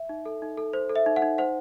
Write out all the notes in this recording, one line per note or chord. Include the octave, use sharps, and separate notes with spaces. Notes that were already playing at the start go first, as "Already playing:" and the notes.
Already playing: E5
D#4
A4
D#4
A4
C5
A4
E5
D#4
F#5
D#4
C5 F#5